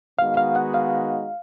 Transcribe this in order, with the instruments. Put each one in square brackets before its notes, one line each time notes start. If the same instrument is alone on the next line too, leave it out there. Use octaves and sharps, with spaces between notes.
[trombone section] D#3 G#3 B3 D#4 F#4 [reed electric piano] F5
[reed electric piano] F5
F#5
F5